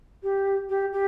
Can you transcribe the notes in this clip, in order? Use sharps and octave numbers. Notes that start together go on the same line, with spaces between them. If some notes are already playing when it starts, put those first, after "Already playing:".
G4
G4
G4